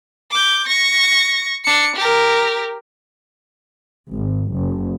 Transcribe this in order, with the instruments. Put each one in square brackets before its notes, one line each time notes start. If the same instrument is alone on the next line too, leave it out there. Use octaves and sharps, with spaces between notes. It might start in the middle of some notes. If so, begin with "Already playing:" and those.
[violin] D6 G6
C#6 A#6
D4 C#7
G4 A#4
[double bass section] G#1
F#1